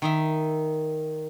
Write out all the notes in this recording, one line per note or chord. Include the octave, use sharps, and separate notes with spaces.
D#3 D#4 E5